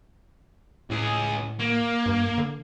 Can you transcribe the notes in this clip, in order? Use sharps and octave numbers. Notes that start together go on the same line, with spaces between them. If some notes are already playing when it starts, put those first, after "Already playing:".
C#2 A2 G#4
A#3
G2
D3